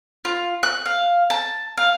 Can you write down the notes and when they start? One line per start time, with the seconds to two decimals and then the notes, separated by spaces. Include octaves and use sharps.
0.25 F4
0.63 F#6
0.86 F5
1.30 A5
1.77 F5